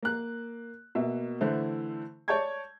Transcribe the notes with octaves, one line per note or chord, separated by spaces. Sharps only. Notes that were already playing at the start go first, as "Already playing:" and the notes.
A#3 F#6
B2 A#3 E5
D3 E3 A3 E4 C5
C#5 D5 A5 C#6 G6 G#6